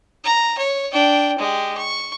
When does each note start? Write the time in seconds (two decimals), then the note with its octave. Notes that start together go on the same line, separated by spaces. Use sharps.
0.24 A#5
0.58 C#5
0.93 D4 G5
1.38 G#3 G4
1.77 C#6